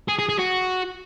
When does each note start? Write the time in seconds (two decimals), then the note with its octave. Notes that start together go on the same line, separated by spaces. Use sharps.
0.08 G#4
0.19 G#4
0.29 G#4
0.39 F#4